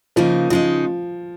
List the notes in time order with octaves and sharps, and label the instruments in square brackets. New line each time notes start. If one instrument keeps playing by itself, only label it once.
[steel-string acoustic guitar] C#3 A#3 D#4 [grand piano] F3
[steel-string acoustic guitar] C#3 G#3 D#4 [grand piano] F3